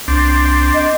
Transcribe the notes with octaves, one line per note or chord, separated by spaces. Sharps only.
C2 C4 D4
D#5